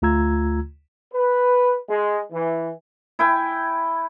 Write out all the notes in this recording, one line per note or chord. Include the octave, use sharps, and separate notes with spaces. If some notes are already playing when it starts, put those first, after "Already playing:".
D2 A3 F4 A#5 E6 G#6
B4
G#3
E3
E4 G5 G#5